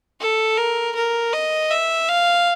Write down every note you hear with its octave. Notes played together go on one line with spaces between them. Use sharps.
A4
A#4
A#4
D#5
E5
F5